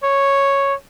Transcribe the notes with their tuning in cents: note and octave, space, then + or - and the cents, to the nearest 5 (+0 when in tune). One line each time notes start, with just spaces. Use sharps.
C#5 -5